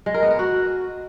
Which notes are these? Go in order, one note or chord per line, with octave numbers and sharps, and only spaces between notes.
G#3
A#4
B3
A#4
F#4